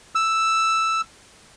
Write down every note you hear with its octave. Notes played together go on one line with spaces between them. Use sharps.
E6